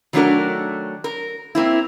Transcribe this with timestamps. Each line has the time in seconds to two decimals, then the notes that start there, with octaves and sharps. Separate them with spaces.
0.13 D#3 F#3 A3 D4 F#4 A#4
1.04 A#4
1.55 A#3 C4 E4